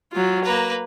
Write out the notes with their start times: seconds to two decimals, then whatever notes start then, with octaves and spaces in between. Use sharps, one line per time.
0.13 F#3 F4
0.44 A#3 B4 A#5